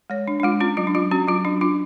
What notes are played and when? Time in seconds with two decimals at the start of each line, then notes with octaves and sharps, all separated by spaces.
0.10 G#3 C#5
0.28 D4
0.40 D4
0.43 G#3 F4
0.60 C#4 F4
0.77 F#3 F4
0.87 D4
0.95 F#3 F4
1.11 C#4 F#4
1.27 F#3 F4
1.45 F#3 D4
1.61 D4 F4